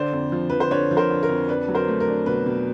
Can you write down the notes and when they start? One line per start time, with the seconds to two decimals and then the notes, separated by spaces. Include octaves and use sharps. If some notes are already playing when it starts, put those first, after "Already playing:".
Already playing: D3 C5 D5
0.13 F2
0.32 F3
0.50 F3 B4
0.60 C5
0.71 D3 B4 C#5
0.91 F3
0.97 A#4 C5
1.10 D3
1.23 A#4
1.29 F2
1.48 D4 B4
1.68 F#3
1.75 A#4 C5
1.88 A3
2.00 A#4
2.08 D4
2.26 B2 B4
2.46 B2